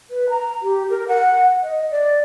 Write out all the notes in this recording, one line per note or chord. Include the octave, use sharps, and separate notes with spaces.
B4
A#5
G4
A#4
F#5
D#5
D5